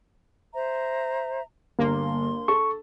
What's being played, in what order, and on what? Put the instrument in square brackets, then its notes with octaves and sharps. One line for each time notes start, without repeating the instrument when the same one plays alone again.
[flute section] C5 E5 A#5
[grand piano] G1 [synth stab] A#3 [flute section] C6
[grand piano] A4 [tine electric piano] C#6